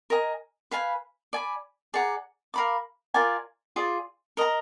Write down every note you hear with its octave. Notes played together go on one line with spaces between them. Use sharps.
A#4 D#5 G#5
B4 F5 G#5 B5
D5 G#5 B5
G#4 D5 F#5 A#5
A#4 F5 B5 D6
F4 A#4 D5 G#5
F4 G#4 D5
A#4 D#5 A#5